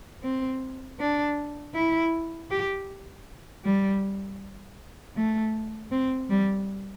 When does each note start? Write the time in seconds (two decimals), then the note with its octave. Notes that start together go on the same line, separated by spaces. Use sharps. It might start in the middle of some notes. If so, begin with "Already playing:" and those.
0.23 C4
0.99 D4
1.75 E4
2.51 G4
3.64 G3
5.16 A3
5.92 C4
6.30 G3